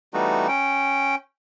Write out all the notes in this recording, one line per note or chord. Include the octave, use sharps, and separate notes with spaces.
E3 G3 A3 B3 D#4 F#4
C#4 G5